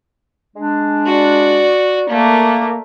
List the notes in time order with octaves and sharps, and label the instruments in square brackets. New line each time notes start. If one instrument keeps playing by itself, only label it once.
[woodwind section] G#3 D4
[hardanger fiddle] F#4 D5
[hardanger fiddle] A3 A#4 [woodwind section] A#3